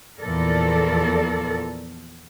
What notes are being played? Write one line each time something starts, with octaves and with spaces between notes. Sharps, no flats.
E2 A#2 F3 A4 A#4 D5